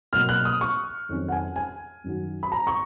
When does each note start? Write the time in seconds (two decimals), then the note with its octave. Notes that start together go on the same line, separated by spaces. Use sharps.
0.13 B2 F#3 A#3 F6
0.29 F#6
0.45 D#6
0.61 C#6
1.09 F2 D#3 F#3 C#4
1.28 F#5
1.32 G#5
1.56 G#5
2.04 F#2 D#3 F#3
2.43 B5
2.52 A#5
2.67 C#6